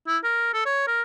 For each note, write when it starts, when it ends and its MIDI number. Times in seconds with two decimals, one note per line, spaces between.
0.07 0.17 64
0.24 0.52 70
0.53 0.64 69
0.66 0.83 73
0.87 1.02 70